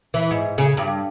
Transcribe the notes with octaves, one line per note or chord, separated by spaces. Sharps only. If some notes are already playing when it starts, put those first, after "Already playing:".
E3
G#2
C#3
G2